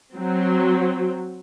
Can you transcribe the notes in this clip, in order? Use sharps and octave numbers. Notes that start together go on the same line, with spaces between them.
F#3 C4